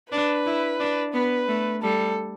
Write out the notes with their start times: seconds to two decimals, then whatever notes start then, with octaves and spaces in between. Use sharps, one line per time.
0.11 D4 B4
0.46 E4
0.80 D4
1.14 B3 B4
1.48 A3
1.82 G3 A4